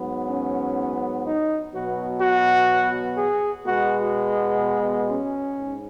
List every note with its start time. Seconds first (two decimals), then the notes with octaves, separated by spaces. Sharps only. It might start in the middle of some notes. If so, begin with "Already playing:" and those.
Already playing: G#2 F#3 B3
0.28 C#4
1.25 D#4
1.73 B2 F#3 B3 F#4
2.21 F#4
3.17 G#4
3.65 B2 G#3 B3 F#4
5.10 C#4
5.58 G#2